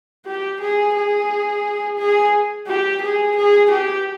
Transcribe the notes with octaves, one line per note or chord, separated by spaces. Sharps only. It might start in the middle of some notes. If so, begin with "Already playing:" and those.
G4
G#4
G#4
G#4
G4
G#4
G#4
G4